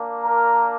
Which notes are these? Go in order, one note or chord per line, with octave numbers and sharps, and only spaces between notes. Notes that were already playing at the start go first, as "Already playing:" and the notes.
Already playing: A#3 D4
A#4 A#5